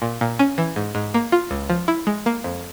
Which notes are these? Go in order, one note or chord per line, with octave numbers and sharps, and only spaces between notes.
A#2
A#2
C#4
E3
G#2
G#2
A#3
F4
C#2
F3
E4
G#3
A#3
F2